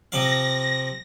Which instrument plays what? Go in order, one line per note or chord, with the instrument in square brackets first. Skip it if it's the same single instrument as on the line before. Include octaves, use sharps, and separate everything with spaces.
[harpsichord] C3 F3 F5 [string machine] A#6